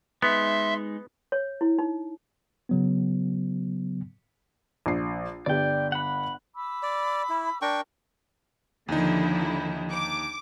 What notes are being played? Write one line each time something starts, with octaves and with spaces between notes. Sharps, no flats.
G#3 B3 D#4 E5 C6
C#5
E4
D#4
C#3 F#3 B3
A#1 C7
G1 G4 D5 G5
F#5 B5
B5 D6 E6
D5
E4
D4 A#4 G5 C#6
D#2 D3 F3 D#4 E4
D6